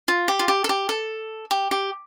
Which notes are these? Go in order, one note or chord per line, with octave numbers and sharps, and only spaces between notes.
F4
G4
F4
G4
A4
G4
A4
G4
G4